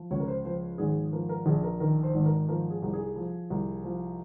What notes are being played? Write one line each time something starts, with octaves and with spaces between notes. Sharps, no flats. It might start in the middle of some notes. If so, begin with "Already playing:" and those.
Already playing: F3
C#2 C#5
A#4
C5
F3 C5
G#1 G#4
F3 A#4
A#4
A#1 G#4
A#4
D#3 A#4
C5
G#1
A#4
F3 A#4
G#4
C2
G#4
F3
C2
F3